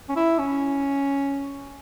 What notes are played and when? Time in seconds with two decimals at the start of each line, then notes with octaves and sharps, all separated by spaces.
0.09 C#4
0.16 E4
0.38 C#4